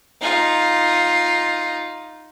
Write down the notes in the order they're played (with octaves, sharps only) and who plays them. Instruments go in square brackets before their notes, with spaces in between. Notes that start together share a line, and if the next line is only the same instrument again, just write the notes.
[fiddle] D#4 F4